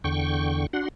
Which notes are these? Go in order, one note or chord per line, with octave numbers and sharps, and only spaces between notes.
E2 D3 G5 C#6
D4 F#4 F#5 C6